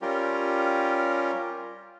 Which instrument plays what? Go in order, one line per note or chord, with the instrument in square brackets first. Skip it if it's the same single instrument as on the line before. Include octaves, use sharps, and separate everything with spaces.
[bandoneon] G3 C#4 F4 G4 A#4